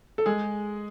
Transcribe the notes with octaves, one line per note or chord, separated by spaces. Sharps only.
A4
G#3 G#4